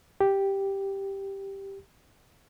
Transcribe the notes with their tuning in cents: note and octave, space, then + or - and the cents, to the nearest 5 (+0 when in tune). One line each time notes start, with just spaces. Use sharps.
G4 +0